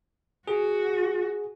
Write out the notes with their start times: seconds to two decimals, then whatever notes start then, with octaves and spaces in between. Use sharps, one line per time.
0.47 F#4 G#4